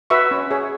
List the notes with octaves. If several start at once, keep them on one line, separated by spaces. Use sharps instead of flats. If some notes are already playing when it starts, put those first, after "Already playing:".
F#4 B4 E5 C#6
C#4
G#4 C#5